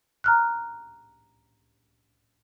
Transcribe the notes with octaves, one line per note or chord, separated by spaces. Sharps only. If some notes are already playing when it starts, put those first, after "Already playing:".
A#5 F6 F#6